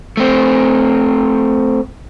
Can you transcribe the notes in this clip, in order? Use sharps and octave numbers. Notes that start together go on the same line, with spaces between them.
A3 C4